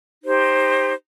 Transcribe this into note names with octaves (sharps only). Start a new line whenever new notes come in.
D#4 G4 C5